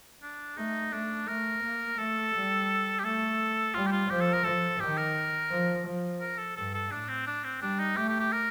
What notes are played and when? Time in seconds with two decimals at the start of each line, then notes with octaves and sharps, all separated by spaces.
0.22 D4
0.57 A3 D#4
0.93 A3 D4
1.28 A3 A#4
1.63 A#3
1.98 A3 A4
2.34 G3
2.99 G4
3.03 A3 A4
3.74 G3 F4
3.86 G4
3.91 F4
4.09 F3 G4
4.21 A4
4.33 A#4
4.44 F3 A4
4.80 D#3 G4
4.97 A#4
5.51 F3
5.86 F3
6.20 A#4
6.38 A4
6.56 G2 A4
6.74 A4
6.91 A2 D4
7.08 C4
7.26 D4
7.44 C4
7.61 G3 D4
7.79 D#4
7.97 A3 G4
8.08 G4
8.20 G4
8.32 A#4